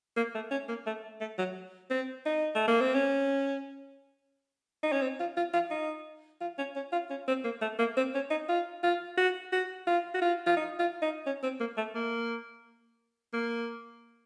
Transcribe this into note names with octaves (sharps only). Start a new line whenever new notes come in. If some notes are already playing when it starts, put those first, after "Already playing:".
A#3
A3
C#4
A#3
A3
A3
F#3
C4
D#4
A3
A#3
C4
C#4
D#4
C#4
C4
F4
F4
F4
D#4
F4
C#4
C#4
F4
C#4
C4
A#3
A3
A#3
C4
C#4
D#4
F4
F4
F#4
F#4
F4
F#4
F4
F4
D#4
F4
D#4
C#4
C4
A#3
A3
A#3
A#3